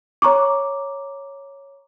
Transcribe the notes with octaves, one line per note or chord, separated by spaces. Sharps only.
C#5 A#5 C#6 D6